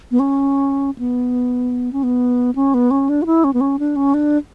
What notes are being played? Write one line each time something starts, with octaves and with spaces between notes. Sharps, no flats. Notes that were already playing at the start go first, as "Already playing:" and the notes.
B3
C#4
B3
C#4
B3
C#4
B3
C#4
D4
F#4
E4
C#4
B3
C#4
D4
C#4
D4